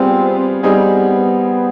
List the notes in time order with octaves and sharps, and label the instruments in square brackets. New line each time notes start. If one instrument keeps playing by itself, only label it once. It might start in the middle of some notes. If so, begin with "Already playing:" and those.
Already playing: [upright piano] G3 B3 F4 G#4 [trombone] C4
[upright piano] G3 C4 D#4 G#4 [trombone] B3